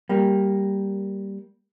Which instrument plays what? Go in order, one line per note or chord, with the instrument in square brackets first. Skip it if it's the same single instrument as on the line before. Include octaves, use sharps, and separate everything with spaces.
[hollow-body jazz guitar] G3 A#3